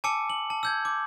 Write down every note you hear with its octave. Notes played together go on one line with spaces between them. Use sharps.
G#5 A5 D6 E6 C#7
F#7
A5
E6 G6 G#6
D6